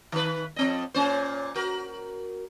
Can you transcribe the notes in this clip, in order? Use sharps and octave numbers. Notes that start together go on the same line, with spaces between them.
D#3 B4
F2 C4 D#5
A#2 C#4 C5
F#4 A#4